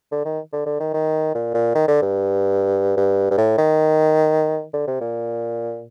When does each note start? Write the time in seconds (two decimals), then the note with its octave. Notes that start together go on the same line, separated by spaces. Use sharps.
0.12 D3
0.25 D#3
0.53 D3
0.66 D3
0.80 D#3
0.94 D#3
1.35 A#2
1.54 A#2
1.75 D#3
1.88 D3
2.02 G2
2.97 G2
3.31 G2
3.38 A2
3.58 D#3
4.74 D3
4.87 C3
5.00 A#2